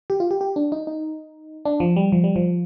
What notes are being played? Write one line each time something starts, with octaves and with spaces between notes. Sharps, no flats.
G4
F4
G4
G4
D4
D#4
D#4
D4
F3
G3
F3
G3
F3